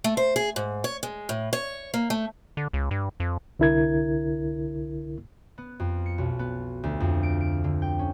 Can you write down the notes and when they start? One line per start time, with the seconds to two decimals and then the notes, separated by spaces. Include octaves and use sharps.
0.04 A3
0.17 C5
0.36 G#4
0.56 G#2
0.84 C#5
1.03 G#3
1.29 A2
1.53 C#5
1.94 A#3
2.10 A3
2.57 D3
2.73 C#2
2.91 G2
3.20 F2
3.59 C2 D3 E4 A#4 G#6
5.58 B3
5.80 F2
6.06 C#7
6.18 B1
6.39 B3
6.83 D2
7.00 F2
7.23 D7
7.41 D7
7.64 D3
7.82 G5
7.99 C#4